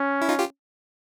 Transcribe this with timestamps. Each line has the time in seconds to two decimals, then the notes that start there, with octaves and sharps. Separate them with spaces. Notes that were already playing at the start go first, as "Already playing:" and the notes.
Already playing: C#4
0.21 E4
0.29 D#4 F4
0.39 F4 G4